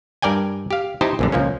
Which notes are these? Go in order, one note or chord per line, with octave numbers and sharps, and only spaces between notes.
G2 A#4 D5 G5 G#5
G4 F5
D#4 E4 G4 C5 D#5 A5
A#1 F#2 D3
C#2 F3 A#3 C#4